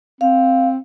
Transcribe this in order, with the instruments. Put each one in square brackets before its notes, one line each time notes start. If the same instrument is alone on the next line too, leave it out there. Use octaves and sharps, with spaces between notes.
[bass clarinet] C4 [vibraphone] F5